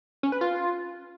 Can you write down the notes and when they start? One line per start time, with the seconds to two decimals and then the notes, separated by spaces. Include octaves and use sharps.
0.23 C#4
0.32 B4
0.41 F4